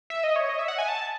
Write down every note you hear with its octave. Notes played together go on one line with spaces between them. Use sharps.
E5
D#5
C#5
D#5
E5
F#5
G#5
A5